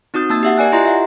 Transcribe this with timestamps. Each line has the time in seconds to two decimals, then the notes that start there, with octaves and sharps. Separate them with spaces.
0.14 C4 D#4 F#4 D#6 G6
0.30 A#3 A5 E6 A6
0.43 G4 E5 F#5
0.58 A#4 D5 G#5 F#6
0.72 E4 F4 G4 D#5 A#5 C6
0.85 E5 F#5